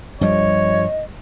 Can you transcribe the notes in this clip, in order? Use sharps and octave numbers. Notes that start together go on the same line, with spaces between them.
G2 F3 G3 C#5 D#5